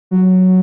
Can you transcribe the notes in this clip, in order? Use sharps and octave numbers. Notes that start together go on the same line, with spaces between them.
F#3